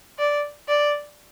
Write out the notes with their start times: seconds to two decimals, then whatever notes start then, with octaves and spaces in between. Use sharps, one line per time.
0.18 D5
0.68 D5